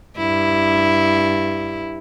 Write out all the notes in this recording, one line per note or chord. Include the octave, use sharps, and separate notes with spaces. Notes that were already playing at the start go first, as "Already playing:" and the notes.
G2 E4